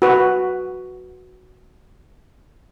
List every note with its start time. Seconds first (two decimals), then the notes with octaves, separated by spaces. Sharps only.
0.02 F#4 B4